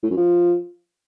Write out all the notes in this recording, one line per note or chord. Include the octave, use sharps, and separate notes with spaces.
A2
F#2
F3